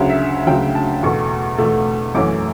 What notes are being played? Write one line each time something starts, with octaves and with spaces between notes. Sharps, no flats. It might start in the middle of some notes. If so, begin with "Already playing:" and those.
Already playing: D2 C#3 F#3
E5
D2 C#3 F#3 G5
A5
E2 B2 A3 C#6
E2 B2 A3
F#2 E3 A3 C#4 D6